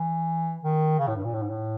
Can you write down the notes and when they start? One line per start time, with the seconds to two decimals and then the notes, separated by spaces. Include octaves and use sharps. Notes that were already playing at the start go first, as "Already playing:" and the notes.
Already playing: E3
0.64 D#3
0.99 C#3
1.07 A2
1.16 G2
1.24 A#2
1.34 A2
1.42 G#2
1.50 A2